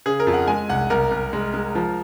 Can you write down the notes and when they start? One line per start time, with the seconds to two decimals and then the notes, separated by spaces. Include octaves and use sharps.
0.06 C#3 G#4
0.20 A#4
0.27 F2
0.33 F#5
0.48 G#3 G#5
0.69 C2 F#5
0.90 C2 A#4
1.11 C2
1.33 G#3
1.54 G#3
1.75 F3